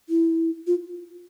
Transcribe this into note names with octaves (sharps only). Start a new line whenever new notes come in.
E4
F4